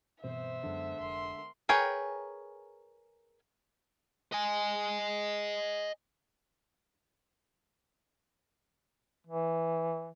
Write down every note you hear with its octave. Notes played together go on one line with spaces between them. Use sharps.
G2 B2 E3 B3 C4 C5 E5
F#2 D3 F#3 G#3 C#4
F1 A#4 C6
G#4 A#4 B4 C#5 G5
D#5 G#5
E3